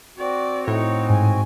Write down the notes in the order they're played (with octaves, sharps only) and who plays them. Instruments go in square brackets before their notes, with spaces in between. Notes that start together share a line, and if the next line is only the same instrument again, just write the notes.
[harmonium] C4 F#4 [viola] D5
[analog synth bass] A2 [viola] D#4 C#5
[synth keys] G#2 [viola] G#5